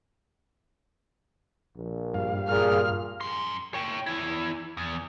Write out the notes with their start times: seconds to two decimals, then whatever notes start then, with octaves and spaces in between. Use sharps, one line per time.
1.76 A#1
2.14 G2 F5
2.48 A#2 G#4 F6
3.21 F#2 C6
3.74 C#5 G5
4.07 E2 E4
4.77 E2